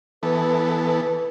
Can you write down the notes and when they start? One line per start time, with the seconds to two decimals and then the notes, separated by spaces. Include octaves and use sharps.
0.23 E3 B3 A4 B4
0.88 B4